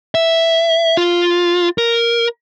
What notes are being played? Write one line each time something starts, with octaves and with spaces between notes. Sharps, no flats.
E5
F4
A#4